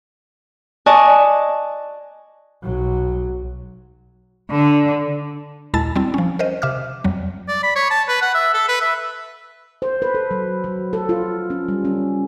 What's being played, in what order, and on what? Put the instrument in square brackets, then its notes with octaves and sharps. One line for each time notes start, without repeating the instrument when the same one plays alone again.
[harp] D5 D#5 G#5 A5 C#6 F#6
[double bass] B1 F#3
[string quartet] D3
[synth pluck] D#2 A#2 G#3 E4 A5 A6
G3 C4 E4
F3 C#4
A#4 C5 D#5
C3 E5 D6 F6
F2 F#3 G3
[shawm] D5
B5
C#5
A5
B4
F#5
E5
A4
B4
E5
[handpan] C5
B4
A4
F#3
F#3
A4
F4
C#4
G3
C#4